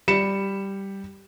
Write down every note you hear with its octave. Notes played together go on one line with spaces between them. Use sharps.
G3 B5 C#7 E7